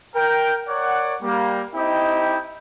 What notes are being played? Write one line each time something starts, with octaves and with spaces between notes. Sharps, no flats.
A#4 G5
A#4 C#5 D5 F#5
G3 A#3
C4 D#4 E4 G4 D#5 G5